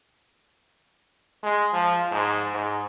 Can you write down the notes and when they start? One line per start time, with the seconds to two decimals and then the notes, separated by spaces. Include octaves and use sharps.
1.43 G#3
1.73 F3
2.11 G#2
2.54 G#2